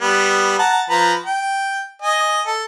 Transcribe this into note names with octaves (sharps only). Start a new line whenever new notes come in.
G3 B3
F#5 A5 A#5
F3 B4 A#5
G5
D#5 G#5
A4